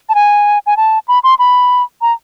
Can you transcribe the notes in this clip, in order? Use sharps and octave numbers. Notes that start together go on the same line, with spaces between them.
A5
G#5
G#5
A5
B5
C6
B5
A#5